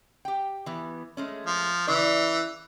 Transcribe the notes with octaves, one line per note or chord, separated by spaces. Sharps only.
G4 G5
E3 B3
G#3 A3 C#4
F3
C#3 E3 D5